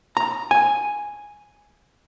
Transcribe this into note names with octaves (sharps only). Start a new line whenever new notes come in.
A#5
G#5